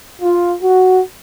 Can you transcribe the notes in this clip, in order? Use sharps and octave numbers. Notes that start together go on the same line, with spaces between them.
F4
F#4